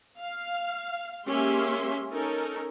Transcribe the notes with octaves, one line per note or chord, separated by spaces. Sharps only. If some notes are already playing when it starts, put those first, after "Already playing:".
F5
G#3 A#3 C#4 G4 E5 C6
C#4 D#4 A4 A#4